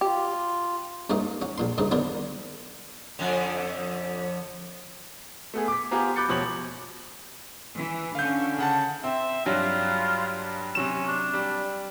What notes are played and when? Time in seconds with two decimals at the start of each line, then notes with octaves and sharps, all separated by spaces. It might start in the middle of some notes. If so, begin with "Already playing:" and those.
0.01 F4 G4
1.10 G2 A3 A#3 C#4 D#4
1.42 C#4 F#4
1.58 A#1 A#2 C6
1.78 G2 C#3 C4 D#4
1.91 D3 D#3 F#3 B3 D4 F#4
3.19 F2 D3
5.54 A3 B3 G#4
5.68 D6 B6
5.91 B3 F4 G4 C5 G#5 A#5
6.16 B5 D6 F#6 G6 A6 C#7
6.29 E1 B2 F3 G4 C#5 F#7
7.75 E3
8.15 D3 C#4 F5 G6
8.58 C#3 F#5 A5
9.04 C4 E5
9.46 G2 F#3 G3 F4
10.75 C3 F#3 C#4 E7
11.07 D4
11.33 G3